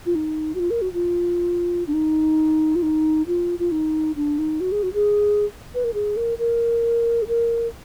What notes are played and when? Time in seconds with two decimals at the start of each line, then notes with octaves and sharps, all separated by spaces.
0.06 F4
0.15 D#4
0.55 F#4
0.60 F4
0.71 A#4
0.82 F#4
0.93 F4
1.87 D4
1.94 D#4
2.76 F4
2.83 D#4
3.27 F4
3.59 F4
3.72 D#4
4.16 D4
4.39 D#4
4.60 F#4
4.72 G#4
4.83 F#4
4.94 G#4
5.75 B4
5.84 A#4
5.94 G#4
6.17 A#4
6.39 A#4
7.22 G#4
7.28 A#4